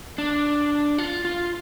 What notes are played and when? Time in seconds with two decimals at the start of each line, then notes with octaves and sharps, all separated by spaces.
0.18 D4
0.98 F4
1.25 F4